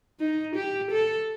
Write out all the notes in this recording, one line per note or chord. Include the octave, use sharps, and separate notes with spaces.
D#4
G4
A4